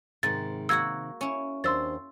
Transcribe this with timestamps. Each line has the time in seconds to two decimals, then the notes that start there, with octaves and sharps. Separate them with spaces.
0.23 G#2 C3 D#3 A6
0.69 A#3 F#4 F#5 E6 G#6
1.21 C#4 E4
1.64 D#2 D4 C5 C6 E6 A6